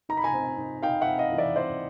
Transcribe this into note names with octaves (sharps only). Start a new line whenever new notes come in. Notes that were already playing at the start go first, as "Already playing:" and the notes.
D#4 A#5
B5
G#5 A#5
C4
D#4
D#4 F5 G5
E5 F#5
C4
D#5 F5
E3
D5 E5
C4 C5 D5